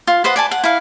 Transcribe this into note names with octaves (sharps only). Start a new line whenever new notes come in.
F4
B4 C5 D#5 F#5
D5 G#5 A5
F#5
E4 F5